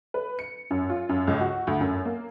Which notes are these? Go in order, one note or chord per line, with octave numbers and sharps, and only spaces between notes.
B4
C#7
F#2
F4
F#2
C#2
F#4
D2
F#2
A#3